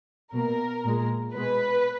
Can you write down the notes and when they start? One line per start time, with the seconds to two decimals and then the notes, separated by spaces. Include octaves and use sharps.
0.33 B2 A#3 A#4
0.84 A#2 G#3
1.35 B2 G#3 B4